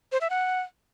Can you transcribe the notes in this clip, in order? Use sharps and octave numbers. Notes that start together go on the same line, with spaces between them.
C5
E5
F#5